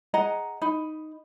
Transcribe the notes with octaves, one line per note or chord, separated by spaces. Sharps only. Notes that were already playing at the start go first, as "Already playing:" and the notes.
G#4 D#5 F#5 A#5
D#4 B5